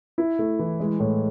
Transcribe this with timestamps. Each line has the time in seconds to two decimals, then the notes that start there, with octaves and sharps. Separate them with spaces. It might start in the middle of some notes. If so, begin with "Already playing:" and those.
0.18 E4
0.39 A3
0.59 E3
0.80 G#3
1.00 A2